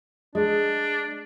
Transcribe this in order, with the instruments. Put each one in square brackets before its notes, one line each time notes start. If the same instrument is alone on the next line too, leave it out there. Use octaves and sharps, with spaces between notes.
[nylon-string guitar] G#3 [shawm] D4